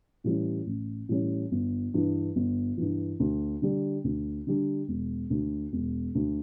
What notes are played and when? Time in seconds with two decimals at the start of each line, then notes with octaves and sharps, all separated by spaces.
0.24 A2 E3 G3 C#4
0.67 A1
1.09 A2 E3 G3 C#4
1.52 G1
1.94 G2 E3
2.36 G1
2.77 G2 E3
3.20 D2
3.62 D3 G3 D4
4.04 D2
4.47 D3 G3 D4
4.88 E1
5.30 D2 D3
5.73 E1
6.15 D2 D3